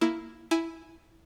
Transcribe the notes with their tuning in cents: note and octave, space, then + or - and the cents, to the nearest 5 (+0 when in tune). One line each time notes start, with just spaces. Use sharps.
A#3 -5 E4 +0
E4 +0 G#5 +0